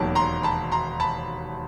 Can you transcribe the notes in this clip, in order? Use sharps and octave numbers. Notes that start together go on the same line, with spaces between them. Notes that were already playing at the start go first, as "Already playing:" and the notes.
Already playing: E1 D#2 D#3 F#3 A5 B5
A#5 C6
A5 B5
A#5 C6
A5 B5